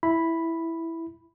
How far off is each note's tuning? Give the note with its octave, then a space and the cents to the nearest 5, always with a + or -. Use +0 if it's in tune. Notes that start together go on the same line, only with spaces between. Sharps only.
E4 +0 B5 +0